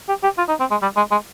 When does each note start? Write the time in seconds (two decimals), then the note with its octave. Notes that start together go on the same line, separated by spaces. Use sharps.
0.09 G4
0.23 G4
0.38 F4
0.49 D#4
0.60 C4
0.71 G#3
0.82 G3
0.97 G#3
1.11 G#3